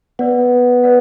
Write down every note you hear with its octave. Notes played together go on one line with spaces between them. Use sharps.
B3 B4 D5 F#5
B4 D5 F#5